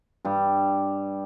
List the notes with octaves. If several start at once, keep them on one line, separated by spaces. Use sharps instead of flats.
G2 G3